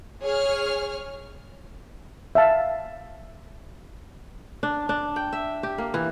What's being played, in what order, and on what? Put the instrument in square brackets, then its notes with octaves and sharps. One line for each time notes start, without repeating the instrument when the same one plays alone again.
[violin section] G#4 C#5 F6
[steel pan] E5 F5 A5
[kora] D4
D4
G5
E5
G4
A#3
E3